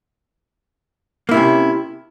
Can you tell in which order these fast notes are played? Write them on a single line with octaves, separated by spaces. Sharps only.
A#3 E4 C3 C#4